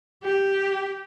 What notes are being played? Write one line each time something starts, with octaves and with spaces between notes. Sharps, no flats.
G4